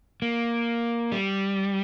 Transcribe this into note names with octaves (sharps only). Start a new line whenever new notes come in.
A#3
G3